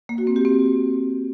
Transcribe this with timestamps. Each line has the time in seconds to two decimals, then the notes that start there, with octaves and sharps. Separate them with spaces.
0.09 A#3
0.18 F#4
0.27 C4
0.36 G4
0.45 C4